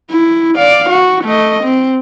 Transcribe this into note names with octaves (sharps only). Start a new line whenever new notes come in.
E4
D5 F5
F#4
A3 D#5
C4